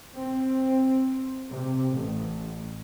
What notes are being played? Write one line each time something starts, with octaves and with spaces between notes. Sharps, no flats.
C4
C3
A1